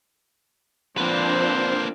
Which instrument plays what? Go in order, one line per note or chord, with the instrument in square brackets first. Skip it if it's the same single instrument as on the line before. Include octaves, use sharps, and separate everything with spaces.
[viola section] F3 C4 D4 [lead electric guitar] A#3 B4 [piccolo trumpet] C5